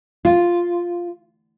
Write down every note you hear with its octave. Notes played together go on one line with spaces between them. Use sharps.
F4